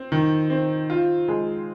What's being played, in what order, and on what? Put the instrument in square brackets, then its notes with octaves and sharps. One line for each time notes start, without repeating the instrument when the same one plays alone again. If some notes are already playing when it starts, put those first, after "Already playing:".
Already playing: [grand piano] C4
D#3
C4
F4
G#3